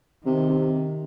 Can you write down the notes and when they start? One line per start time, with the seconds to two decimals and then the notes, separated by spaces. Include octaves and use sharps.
0.25 C3 D#3
0.49 C3